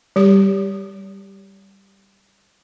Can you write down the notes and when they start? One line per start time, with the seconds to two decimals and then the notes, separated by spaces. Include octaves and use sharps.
0.16 G3 G4